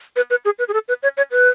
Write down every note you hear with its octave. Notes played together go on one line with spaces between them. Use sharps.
B4
B4
G#4
B4
G#4
A4
B4
C#5
C#5
B4